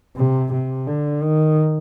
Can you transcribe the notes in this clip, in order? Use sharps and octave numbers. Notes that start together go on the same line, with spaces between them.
C3
C3
D3
D#3